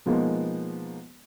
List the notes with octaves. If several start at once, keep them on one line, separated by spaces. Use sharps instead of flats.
B2 F3 G#3 A#3 B3 D#4